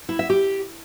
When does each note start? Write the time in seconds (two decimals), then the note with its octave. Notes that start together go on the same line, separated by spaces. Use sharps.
0.09 E4
0.19 E5
0.30 G4